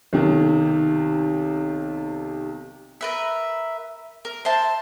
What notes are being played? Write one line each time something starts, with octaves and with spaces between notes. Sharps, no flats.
B1 C3 D#3
A#4 B4 E5
A#4
C5 E5 A5